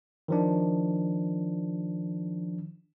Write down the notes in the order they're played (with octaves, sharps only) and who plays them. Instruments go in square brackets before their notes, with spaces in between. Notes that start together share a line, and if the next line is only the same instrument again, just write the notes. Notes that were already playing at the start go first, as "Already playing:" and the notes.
[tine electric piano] D#3 F3 D4